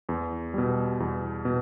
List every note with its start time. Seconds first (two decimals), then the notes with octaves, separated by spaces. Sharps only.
0.09 E2
0.54 B2 G3
1.00 E2
1.45 B2